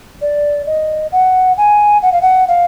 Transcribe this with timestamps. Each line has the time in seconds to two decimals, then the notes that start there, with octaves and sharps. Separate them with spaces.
0.22 D5
0.66 D#5
1.12 F#5
1.57 G#5
2.02 F#5
2.12 F5
2.22 F#5
2.48 F5